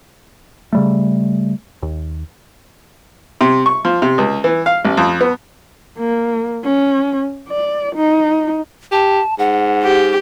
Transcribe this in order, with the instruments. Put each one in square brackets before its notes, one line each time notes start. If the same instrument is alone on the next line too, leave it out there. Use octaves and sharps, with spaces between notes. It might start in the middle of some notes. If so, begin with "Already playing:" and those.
[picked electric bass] C#3 G3 A3
D#2
[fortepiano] C3
C#6
F3
C3
C#2
E3
F5
A1
F2
B3
[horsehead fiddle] A#3
C#4
D5
D#4
[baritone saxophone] G4 [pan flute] A5
[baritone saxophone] G#2 [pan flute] F#5
[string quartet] G4